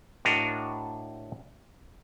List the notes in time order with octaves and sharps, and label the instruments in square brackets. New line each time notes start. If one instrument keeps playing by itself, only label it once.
[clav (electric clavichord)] A2 D4 F#4 A#4 D#5